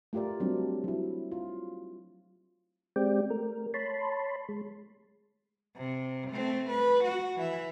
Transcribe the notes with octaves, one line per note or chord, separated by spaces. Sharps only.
A3 F4 G4 A#4 D5
F#3 G3 C4 D4
F#3 E4
F4
G#3 C4 G4 D5 G5
A3 A#4
C#5 A5 B5 C6
G#3
C3
A3 C4
B4
F#4
E3 E5